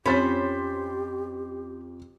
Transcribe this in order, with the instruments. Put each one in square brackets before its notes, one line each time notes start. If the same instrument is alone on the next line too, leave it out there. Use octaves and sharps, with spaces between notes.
[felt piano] F2 A6 B6 [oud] C#4 [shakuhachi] G4 [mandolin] C5 B5